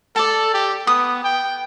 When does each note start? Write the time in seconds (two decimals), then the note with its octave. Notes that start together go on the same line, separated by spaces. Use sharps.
0.16 A4 D5 A5
0.54 G4
0.87 B3 D#6
1.24 G5